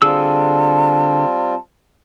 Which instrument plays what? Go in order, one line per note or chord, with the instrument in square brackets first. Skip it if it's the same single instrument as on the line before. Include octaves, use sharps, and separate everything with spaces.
[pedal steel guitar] D3 G#4 E6 [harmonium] G3 C4 F4 [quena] A5